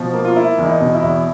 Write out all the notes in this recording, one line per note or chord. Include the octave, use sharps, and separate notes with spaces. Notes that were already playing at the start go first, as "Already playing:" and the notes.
Already playing: B2 F3
A#3
F4
A#3 E4
E2
D#4
B2
E4
E2